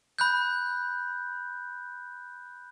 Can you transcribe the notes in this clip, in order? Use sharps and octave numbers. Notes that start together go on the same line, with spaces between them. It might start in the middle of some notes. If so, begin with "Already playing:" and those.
B5 F#6 G6